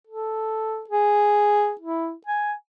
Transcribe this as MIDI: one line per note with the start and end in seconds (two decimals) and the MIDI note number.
0.07 0.83 69
0.90 1.73 68
1.81 2.13 64
2.27 2.53 80